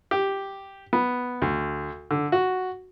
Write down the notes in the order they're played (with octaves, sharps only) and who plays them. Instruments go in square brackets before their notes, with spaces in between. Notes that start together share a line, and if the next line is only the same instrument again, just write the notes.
[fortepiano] G4
B3
D2
D3
F#4